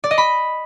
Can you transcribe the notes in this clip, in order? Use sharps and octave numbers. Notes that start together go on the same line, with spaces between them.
D5
D#5
B5